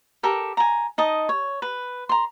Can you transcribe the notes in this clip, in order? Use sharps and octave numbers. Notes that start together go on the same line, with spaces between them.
G4 A4 A#4
G#5 A#5
D#4 D#5 A5
C#5
B4
A#5 C6